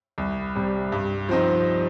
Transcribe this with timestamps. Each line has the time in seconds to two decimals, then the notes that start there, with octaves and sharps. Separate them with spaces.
0.18 C2
0.56 C3 G3
0.92 G2
1.29 F3 C4 D#4